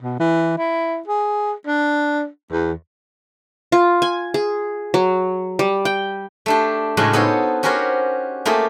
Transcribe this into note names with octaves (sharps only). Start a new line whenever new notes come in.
B2
E3
E4
G#4
D4
E2
F4
G#5
G#4
F#3
G3
G5
A3 D4 G4
A2 C#3 G#3 D4 F4 F#4
B3 D#4 A4 C5 C#5
C#4 F#4 G4 A#4 C5 C#5
A3 A#3 F4 G4 G#4